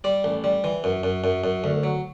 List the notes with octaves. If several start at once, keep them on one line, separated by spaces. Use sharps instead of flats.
G3 D5
A1
G3
E3
F#2
F#2
F#2
F#2
D2
F#3